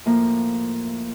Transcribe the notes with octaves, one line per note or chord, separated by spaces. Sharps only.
A2 F3 A#3